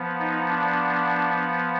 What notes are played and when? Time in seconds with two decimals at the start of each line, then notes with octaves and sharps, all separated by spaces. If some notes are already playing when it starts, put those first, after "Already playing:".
Already playing: F3 B3
0.19 D#4
0.49 D4